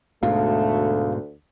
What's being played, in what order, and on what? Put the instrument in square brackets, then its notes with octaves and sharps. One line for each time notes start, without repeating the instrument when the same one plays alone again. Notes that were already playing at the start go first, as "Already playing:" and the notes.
[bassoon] D2 [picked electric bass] G#2 B2 [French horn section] A3 [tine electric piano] F5